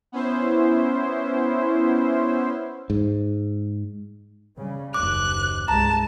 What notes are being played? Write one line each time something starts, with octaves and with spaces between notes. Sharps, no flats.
B3 C#4 E4 C5
G#2
C#3 G3 C#4
F#1 D#2 D6 F#6
C2 G2 G#3 A5 A#5